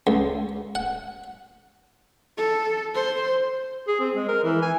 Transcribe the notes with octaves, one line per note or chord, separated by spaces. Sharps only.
C#2
F#5
A4
C5
G#4
C4
G#3
A#4
E3
G#5